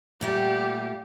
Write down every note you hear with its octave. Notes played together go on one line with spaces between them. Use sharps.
A#2 G3 A3 G4 F#5